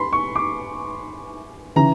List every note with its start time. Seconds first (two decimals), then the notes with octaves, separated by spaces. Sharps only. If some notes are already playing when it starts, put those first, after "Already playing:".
Already playing: B5 C6
0.13 C#6
0.35 D6
1.76 C#3 E3 A#5